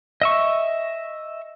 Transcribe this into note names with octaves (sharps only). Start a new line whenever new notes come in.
D#5 E5 C#6